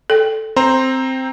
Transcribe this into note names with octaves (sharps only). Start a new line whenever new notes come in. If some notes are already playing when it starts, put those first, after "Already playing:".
A4 G5
C4 C5 A#5